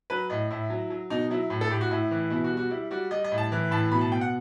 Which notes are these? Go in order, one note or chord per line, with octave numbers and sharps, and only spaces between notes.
F#3 B4
A2 D#5
A2 E4
F#3
F#3
B2 D#4
F#3 E4
A2
A4
A2 G4
F#4
A2 E4
E3
B2 E4
F#4
G3
F#4
G3 E4
G3 F#4
G3 D#5
D#5
A2
A5
E3
A2 A5
B2 B5
A5
B2 G5
F#5